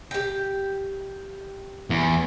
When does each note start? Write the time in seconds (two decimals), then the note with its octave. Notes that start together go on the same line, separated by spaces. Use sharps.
0.11 G4 G5
1.90 E2